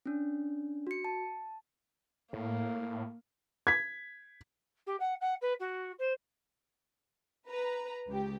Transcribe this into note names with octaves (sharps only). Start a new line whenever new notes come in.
C#4 D4
F#4 C#7
A5
A2 A#3
G#6 B6
G4
F#5
F#5
B4
F#4
C5
B4 A#5
C#2 G4